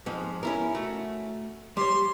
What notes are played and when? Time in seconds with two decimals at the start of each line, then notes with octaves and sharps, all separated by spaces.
0.06 F2 G#2 F3
0.43 C#4 E4 A#4
0.75 A3 F#4
1.77 G3 C#5 C6